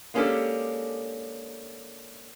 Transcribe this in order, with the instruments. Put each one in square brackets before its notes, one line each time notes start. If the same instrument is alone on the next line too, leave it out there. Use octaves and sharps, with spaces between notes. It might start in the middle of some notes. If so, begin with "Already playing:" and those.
[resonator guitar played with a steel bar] G#3 A#3 C#4 D4 G4 A4